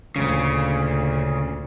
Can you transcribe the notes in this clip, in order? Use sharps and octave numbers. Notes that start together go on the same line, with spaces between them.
D2 A#2 C#3